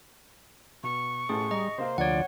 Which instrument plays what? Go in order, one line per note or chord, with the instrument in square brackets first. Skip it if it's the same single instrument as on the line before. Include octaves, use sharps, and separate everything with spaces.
[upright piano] B2 [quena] C#6
[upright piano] A1 A2 A5 [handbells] G#4
[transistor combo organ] G3 [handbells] D#5 [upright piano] A#5
[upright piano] C3 A#3 C4 [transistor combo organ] C5
[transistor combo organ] D2 F3 [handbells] C#5 F#5 [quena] D5